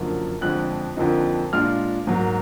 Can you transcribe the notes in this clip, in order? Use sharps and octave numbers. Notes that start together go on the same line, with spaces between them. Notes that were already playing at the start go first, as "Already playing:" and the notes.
Already playing: F#2 D3 F3 A#3
F2 D3 F3 G#3 F#6
F2 D3 F3 A#3 D#4
A#2 G#3 D4 F4 F6
G#2 F#3 A#3